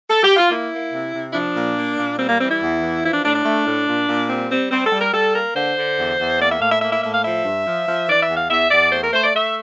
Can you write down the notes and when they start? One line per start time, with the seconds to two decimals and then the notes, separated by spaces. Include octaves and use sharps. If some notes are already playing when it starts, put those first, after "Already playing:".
0.10 A4
0.23 G4
0.37 F4
0.50 A#3 E4
0.71 A#3
0.93 C3
1.13 C3
1.30 E4
1.34 F3 D4
1.55 A#2
1.76 A#3
1.97 A#2
2.18 G3 C4
2.29 A#3
2.39 E3 C4
2.50 E4
2.61 E2
2.81 E3
3.02 F3 E4
3.13 D4
3.24 A2 D4
3.34 D4
3.45 A3
3.66 A2
3.87 A#2
4.08 A#2
4.29 G3 C4
4.50 G3 C4
4.71 G3 C4
4.85 A4
4.92 G3
4.99 A#4
5.13 G3 A4
5.34 A#3 A#4
5.55 D3 C5
5.77 D3
5.98 E2
6.18 E2
6.40 A#3 D5
6.50 E5
6.60 A2 F5
6.71 E5
6.81 A#3 E5
6.92 E5
7.02 A2 E5
7.13 F5
7.23 F3 E5
7.44 G2
7.66 F3
7.87 F3
8.08 E3 D5
8.22 E5
8.29 E2
8.36 F5
8.50 E2 E5
8.71 E2 D5
8.92 A3 C5
9.03 A#4
9.13 A3 C5
9.23 D5
9.34 A3 E5